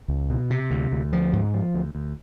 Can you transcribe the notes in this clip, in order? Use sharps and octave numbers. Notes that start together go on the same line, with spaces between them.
C#2
B2
C3
D2
D2
F3
G#2
F3
D2
D2